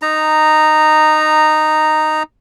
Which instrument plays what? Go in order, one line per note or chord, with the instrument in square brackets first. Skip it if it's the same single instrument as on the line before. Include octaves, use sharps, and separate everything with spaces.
[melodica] D#4 A#5